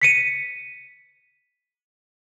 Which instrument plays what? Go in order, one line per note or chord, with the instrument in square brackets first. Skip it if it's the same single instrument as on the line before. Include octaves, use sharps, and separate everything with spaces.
[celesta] B6 C#7 D#7